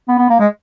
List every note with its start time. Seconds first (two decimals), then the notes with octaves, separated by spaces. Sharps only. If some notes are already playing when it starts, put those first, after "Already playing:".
0.08 B3
0.18 B3
0.30 A#3
0.40 G#3